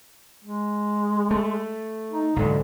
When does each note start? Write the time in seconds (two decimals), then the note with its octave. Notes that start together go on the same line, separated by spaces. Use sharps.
0.44 G#3
1.31 A3
2.11 D#4
2.36 B1 G#2 D3